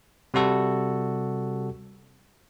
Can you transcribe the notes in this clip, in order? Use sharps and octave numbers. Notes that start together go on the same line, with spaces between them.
C3 G3 F#4 A4